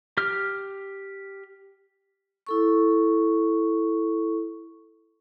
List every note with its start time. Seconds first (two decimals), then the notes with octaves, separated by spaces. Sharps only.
0.17 G4 F6
2.47 E4 A4 C#6